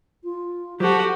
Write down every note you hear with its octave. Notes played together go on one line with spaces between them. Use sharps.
F4
F#3 F#4 G4 A4 C5